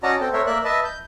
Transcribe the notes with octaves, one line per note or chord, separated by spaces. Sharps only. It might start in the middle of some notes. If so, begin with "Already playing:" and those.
C#4 F#4 D5 D#5 A5 A#5
C4 A4 G5
A3 A#4 C5 C#5 E5
A#3 A#4 D5 E5 F#6
B4 D#5 E5 A5
G6